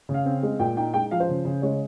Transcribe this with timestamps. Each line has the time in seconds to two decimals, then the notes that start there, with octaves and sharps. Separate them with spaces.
0.09 C#3
0.14 F5
0.26 C4
0.43 G#3
0.59 A#2 G5
0.77 D#4 G5
0.94 G#3 G5
1.11 F3 F5
1.20 C5
1.29 C#3
1.45 C#3
1.62 G#3 C#5